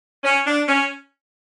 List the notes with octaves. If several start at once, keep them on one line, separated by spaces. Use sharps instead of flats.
C#4
D4
C#4